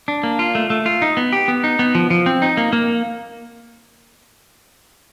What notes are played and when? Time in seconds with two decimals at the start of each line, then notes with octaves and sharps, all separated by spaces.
0.08 D4
0.23 A#3
0.39 F4
0.55 A3
0.70 A3
0.86 F4
1.02 D#4
1.17 B3
1.33 G4
1.48 B3
1.64 D#4
1.79 B3
1.95 F3
2.10 F3
2.26 C4
2.42 D#4
2.57 A#3
2.73 A#3